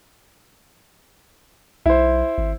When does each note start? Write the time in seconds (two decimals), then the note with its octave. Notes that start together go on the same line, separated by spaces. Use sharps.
1.86 B1 E4 C5
2.38 G#1